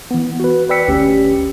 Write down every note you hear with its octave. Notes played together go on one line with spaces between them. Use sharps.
E3 B3
F#4 B4
B4 D5 G5 E6 B6 C#7
G1 D2 C#4 G4